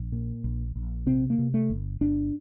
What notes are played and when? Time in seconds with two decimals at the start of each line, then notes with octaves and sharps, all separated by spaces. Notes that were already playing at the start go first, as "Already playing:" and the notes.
Already playing: A#1
0.12 A#2
0.44 A#1
0.76 A#1
1.06 C3 C4
1.30 A#3
1.39 C3
1.54 A3
1.70 G1
2.01 G1 D4